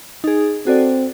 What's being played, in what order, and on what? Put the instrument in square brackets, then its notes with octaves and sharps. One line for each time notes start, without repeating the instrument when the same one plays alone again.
[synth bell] D#4 G#4
[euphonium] C4 [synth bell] F#4 A4 D5